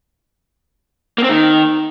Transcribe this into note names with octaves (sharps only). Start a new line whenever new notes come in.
A#3
C4
D#3